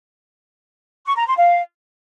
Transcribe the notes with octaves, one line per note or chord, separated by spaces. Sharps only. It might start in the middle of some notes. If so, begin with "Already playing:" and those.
C#6
A#5
C6
F5